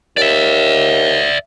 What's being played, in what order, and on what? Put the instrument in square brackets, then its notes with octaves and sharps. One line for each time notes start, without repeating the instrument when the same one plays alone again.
[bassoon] D#2 [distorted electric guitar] D5 E5